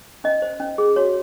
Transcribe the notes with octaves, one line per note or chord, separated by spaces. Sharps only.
C#4 D#5
C5
C#4
G#4
F#4 C#5